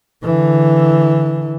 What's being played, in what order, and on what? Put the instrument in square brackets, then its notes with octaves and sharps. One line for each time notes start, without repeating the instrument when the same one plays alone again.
[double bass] D3 E3